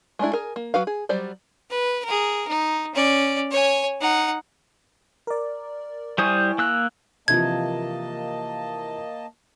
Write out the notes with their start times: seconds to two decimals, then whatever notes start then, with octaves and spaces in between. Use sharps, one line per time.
0.19 G#3 A3 D4 E4
0.33 G#4 A#4
0.56 A#3
0.74 F#3 F#4 B4 F5
0.87 G#4
1.09 F#3 G3 C5 D5
1.70 B4
2.05 G#4 A#4
2.49 D#4
2.94 C#4 D5
3.51 C#5 G#5
4.01 D#4 F#5
5.27 A#4 D5
6.18 G3 E4 C5 G#5 C#6 D#6
6.58 A#3 E6 F#6
7.28 C3 E3 F3 A#3 D#5 A5 G#6